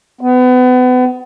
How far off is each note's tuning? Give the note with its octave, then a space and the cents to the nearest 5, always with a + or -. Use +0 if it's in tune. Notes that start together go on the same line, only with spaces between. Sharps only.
B3 +30